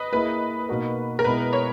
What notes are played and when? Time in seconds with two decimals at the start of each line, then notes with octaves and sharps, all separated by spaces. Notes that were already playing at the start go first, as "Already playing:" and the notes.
Already playing: B4 D#5
0.12 A#3 E4 G#4 B4
0.69 B2 A#3 D#4 F#4 A#4
1.19 A#4
1.24 B2 G#3 B3 E4 G#4 B4
1.53 C#5